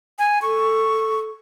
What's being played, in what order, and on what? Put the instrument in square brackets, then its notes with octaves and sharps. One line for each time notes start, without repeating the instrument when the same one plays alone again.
[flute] G#5
[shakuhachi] A4 [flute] C#6